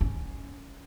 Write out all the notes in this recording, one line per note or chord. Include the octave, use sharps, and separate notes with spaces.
C#4